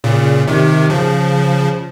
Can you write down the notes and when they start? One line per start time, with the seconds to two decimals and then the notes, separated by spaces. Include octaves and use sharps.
0.04 A#2 C#3
0.47 C3 D#3
0.90 C#3 F3